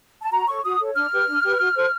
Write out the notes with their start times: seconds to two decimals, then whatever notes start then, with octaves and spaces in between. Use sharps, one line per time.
0.22 A5
0.32 F#4 A#5
0.47 A4 C#5 C#6
0.64 F#4 D#6
0.80 A4 C#5
0.95 D4 F6
1.12 G4 B4
1.28 D4
1.43 G4 B4
1.59 F#4
1.75 A4 C5